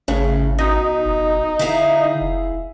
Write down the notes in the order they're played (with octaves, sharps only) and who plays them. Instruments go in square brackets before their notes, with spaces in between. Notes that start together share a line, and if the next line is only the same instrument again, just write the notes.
[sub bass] G#1 [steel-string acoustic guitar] A2 [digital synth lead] C#3
[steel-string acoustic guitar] B2 [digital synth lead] D#4
[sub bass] F#1
[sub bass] D3 [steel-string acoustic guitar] E4 G#4 F5
[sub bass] F1